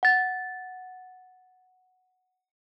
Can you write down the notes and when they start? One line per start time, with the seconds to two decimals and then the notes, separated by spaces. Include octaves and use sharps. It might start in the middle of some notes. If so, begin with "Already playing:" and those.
0.03 F#5 A6